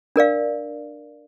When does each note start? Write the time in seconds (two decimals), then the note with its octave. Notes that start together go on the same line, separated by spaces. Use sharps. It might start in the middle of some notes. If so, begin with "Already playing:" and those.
0.16 D4 A#4 D5 F5